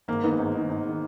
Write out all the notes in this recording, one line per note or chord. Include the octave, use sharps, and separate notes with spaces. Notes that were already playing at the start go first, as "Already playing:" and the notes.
G#1 A#3
G#2 D#3 B3
G#1
G#2 D#3
G#1
D#3